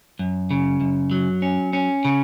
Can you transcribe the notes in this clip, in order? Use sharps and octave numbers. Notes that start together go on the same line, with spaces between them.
F#2
C#3
F#2
F#3
C#4
C#4
C#3